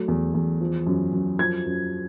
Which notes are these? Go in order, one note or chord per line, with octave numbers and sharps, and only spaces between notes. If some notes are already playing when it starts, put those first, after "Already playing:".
Already playing: F#3 A3
E2
E2
F3
F#2
F#2
F3 G#6
F#2